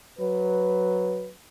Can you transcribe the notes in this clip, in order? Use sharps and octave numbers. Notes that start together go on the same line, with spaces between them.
F#3 B4